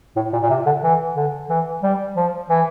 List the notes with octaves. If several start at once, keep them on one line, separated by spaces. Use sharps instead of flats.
A2
A#2
A#2
C3
D3
E3
D3
E3
G3
F3
E3